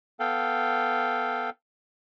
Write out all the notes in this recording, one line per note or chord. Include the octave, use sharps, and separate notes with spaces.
B3 A4 F5 G5